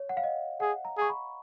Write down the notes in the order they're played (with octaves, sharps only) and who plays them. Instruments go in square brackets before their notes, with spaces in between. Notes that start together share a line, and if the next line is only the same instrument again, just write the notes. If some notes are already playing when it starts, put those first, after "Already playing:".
Already playing: [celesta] C#5
F#5
F5
D#5
[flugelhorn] G#4 [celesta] F#5
[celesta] A#5
[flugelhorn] G#4 [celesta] C#6
[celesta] B5